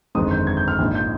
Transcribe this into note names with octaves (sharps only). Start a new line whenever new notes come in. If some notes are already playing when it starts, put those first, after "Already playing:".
G1 F2 D#3 G#3 C4 D#6
G6
G#6
G6
F6
A#1 G#2 F3
G6